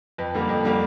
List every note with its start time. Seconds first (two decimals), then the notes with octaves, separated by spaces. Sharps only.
0.18 F2 B4
0.35 D3 G3 A#3
0.49 F2
0.65 D3 G3 A#3